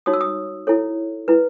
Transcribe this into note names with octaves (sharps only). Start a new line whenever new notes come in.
D#4 F#4 C#5 D#6
E6
D#6
E4 A4 C#5
E4 B4